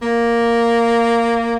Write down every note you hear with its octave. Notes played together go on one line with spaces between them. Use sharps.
A#3